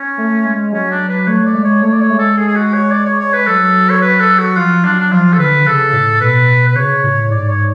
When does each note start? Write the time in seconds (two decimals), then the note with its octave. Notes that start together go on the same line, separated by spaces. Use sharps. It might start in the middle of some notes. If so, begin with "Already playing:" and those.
Already playing: C#4
0.18 A3
0.45 G#3
0.73 F#3 C#4
0.91 D4
1.09 B4
1.27 A3 C#5
1.46 D5
1.55 G#3
1.64 C#5
1.82 A3 C#5
1.93 D5
2.01 C#5
2.10 G#3
2.19 A4
2.37 G#4
2.48 G#4
2.56 F#4
2.74 C#5
2.92 D5
3.06 C#5
3.20 C#5
3.33 B4
3.47 F#3 A4
3.90 C#5
4.02 B4
4.20 A4
4.39 F#4
4.56 F3 F4
4.84 F#3 D4
5.00 D4
5.12 F3 F4
5.33 A4
5.39 D3 B4
5.58 D3
5.66 C#3 A4
5.93 A2
6.21 B2 B4
6.68 B4
6.75 C#3 C#5
7.04 A2
7.30 G#2 D5
7.49 C#5